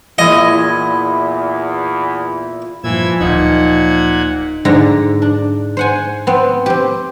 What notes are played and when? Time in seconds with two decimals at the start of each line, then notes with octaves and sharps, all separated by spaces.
0.18 E2 A#2 E4 D#5
2.84 G2 A#2 E3 F3 E6 G#6
3.20 D1 A#2 A#3 D#4 F#5 G#6
4.65 G#2 D3 A#5
5.22 D4
5.77 C5 F#5 G#5
6.27 B3 C4
6.66 C4 G4